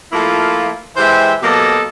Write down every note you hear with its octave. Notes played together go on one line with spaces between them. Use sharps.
F3 A3 A#3 E4 F4
E3 G#3 G4 C5 E5 G5
B2 F#3 A#3 G4 A4 D#5